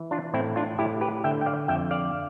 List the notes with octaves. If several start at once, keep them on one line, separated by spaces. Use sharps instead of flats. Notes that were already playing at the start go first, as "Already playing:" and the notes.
Already playing: E3
D4 F4
A2 C4 E4
D4 F4
A2 E4 G4
G4 B4
D3 E5 G5
G5
D5 F5
F2 E5 G5
D5 F5